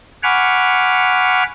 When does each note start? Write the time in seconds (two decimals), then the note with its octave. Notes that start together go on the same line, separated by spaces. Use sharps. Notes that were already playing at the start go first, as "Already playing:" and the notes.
0.23 F#5 G#5 B5 C#6 D6 F6